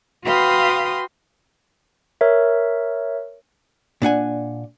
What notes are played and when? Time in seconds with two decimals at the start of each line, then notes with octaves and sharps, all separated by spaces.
0.25 F#4 B4 F5 G5 C6 D#6
2.21 A#4 C#5 E5
4.02 A#2 D4 F#5 G#5